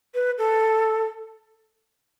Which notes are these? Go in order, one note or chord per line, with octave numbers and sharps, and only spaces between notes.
B4
A4